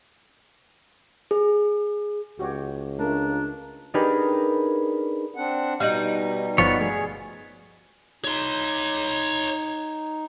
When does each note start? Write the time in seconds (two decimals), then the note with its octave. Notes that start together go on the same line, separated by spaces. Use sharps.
1.31 G#4
2.39 C#2 F#4 G4 C#5
2.99 A3 D4 F4 A#4
3.94 D4 D#4 G4 G#4 A#4 B4
5.34 C4 D4 F#5
5.80 B2 G3 D#4 F5 F#6
6.58 G1 F3 B3 F4 F#4 C#5
6.81 A3 G#4
8.24 D#4 C#5 C6